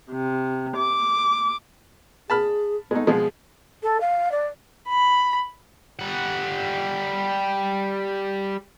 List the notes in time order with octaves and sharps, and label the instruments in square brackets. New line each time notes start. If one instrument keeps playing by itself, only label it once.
[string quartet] C3
D6
[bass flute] G#4 [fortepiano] A5 B5 F6
[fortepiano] G#3 A3 D#4 [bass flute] B3
[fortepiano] B2 F3 G#3 [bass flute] G#4
[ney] A4
F5
D5
[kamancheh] B5
[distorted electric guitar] G3 F#5